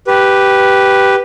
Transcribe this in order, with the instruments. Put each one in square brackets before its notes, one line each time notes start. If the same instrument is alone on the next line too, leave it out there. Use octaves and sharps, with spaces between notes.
[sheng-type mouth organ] G4 B4